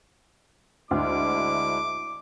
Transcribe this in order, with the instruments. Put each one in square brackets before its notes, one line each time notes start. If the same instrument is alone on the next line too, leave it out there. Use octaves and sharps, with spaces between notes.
[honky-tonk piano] D2 [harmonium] G#3 D4 E4 [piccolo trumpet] D6